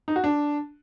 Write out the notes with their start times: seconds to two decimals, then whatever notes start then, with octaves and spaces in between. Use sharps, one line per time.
0.08 D#4
0.16 F#4
0.24 D4